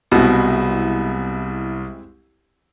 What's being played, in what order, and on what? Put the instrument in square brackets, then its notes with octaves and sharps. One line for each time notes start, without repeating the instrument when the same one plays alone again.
[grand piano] C2 [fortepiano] B2 [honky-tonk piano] G#3 C4 E4